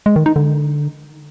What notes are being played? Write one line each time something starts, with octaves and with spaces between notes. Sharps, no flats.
G#3
D#3
D#4
D3